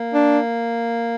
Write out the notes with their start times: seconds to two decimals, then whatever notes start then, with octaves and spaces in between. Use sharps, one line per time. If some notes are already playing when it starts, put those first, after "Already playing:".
Already playing: A#3
0.14 D4